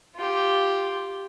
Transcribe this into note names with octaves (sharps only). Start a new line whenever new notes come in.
F4 G4